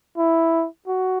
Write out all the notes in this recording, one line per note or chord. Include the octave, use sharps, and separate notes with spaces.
E4
F#4